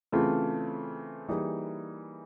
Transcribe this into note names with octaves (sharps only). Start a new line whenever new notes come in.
C#3 E3 A3 C4 F4
E3 G3 A#3 D#4 G#4